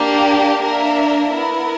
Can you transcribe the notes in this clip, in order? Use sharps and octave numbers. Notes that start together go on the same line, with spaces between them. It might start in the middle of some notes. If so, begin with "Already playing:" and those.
Already playing: A#3 D4 G4
A#3 D4 A#4 E5
B3 E4 A#4